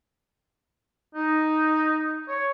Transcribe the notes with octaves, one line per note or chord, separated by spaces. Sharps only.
D#4
C#5